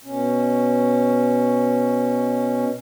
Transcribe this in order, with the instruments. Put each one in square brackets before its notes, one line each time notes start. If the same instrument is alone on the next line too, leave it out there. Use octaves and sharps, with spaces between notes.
[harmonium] B2 C#4